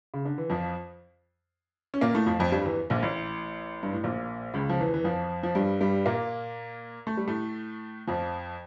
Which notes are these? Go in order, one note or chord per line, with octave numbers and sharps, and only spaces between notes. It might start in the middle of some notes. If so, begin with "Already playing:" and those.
C#3
D3
E3
F2 F3
C#4
A#2 A#3
A2 A3
F2 F3
F2 F3
G2 G3
E2 E3
A#1 A#2
A1 A2
G2
A2
A#1 A#2
C#2 C#3
F3
E2 E3
E3
F2 F3
F3
G2 G3
G2 G3
A#2 A#3
A3
G3
A2 A3
F2 F3